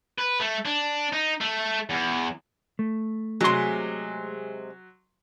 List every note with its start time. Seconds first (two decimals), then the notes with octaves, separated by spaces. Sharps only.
0.18 B4
0.40 A3
0.65 D4
1.13 D#4
1.41 A3
1.90 E2
2.79 A3
3.41 C3 F#3 G#3 C6